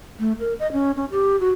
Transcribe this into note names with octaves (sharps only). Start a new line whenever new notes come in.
A3
A#4
D#5
C#4
C#4
G4
F#4